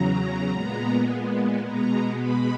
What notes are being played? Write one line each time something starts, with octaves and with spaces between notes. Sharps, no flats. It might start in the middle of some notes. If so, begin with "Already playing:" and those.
Already playing: E2 C#3 F#3 A#5
A#2 G#3 B3
B2 G#3 B3 A#5
B5